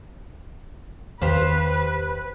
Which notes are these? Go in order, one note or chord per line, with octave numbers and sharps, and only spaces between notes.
E2 D#3 G4 B4 C5 F5